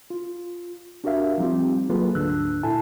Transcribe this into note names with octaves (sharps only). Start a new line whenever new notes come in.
F4
D4 F#4 G4 A#4 E5 F5
F3 G3 C4 D#4 F4 G4
F#3 A#3 F4 G#4 A4 B4
D2 G#2 D3 D4 E6 F#6
A#2 E4 A4 G#5 A5